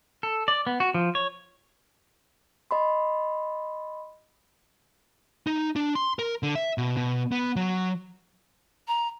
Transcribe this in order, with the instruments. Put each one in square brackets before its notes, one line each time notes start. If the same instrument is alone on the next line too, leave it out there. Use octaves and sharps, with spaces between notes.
[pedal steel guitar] A4
D5
B3
F#4
F3
C#5
[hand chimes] D#5 B5 C6
[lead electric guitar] D#4
D4
C6
A#4
D3
E5
B2
B2
B3
F#3
[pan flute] A#5